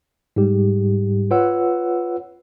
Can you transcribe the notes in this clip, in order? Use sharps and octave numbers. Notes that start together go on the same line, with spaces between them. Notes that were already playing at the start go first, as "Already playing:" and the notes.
G#2 G3 G4
F4 B4 C#5 F#5 E6